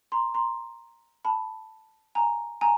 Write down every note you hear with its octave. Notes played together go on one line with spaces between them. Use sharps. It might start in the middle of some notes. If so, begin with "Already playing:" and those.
A#5 C6
A#5 C6
A5 B5
G#5 A#5
G#5 A#5